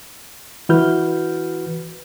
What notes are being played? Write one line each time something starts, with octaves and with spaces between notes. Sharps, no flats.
E3 F#4 B4 F6 G6